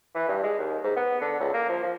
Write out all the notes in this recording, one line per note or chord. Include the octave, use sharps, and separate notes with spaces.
E3
G2
G#3
D#2
G#2
B3
D3
C#2
A#3
F3
F3